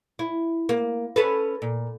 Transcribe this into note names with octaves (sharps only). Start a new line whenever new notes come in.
E4
A#3
C#4 A4 B4
A#2